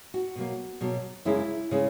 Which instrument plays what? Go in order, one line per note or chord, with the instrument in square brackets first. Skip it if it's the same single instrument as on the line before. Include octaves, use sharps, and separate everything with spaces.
[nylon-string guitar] F#4
B2 F#3 A#3
B2 F#3 A#3
F#2 C#3 G#3 C#4 E4
C#3 G#3 C#4